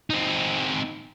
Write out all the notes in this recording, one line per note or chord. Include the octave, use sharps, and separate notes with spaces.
C4 D#4